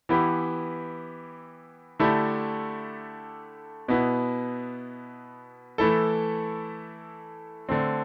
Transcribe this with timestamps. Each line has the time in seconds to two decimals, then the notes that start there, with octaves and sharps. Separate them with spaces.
0.09 E3 B3 E4 G4
1.99 D3 A3 E4 G4
3.88 B2 B3 E4
5.78 E3 A3 E4 A4
7.69 D3 A3 C4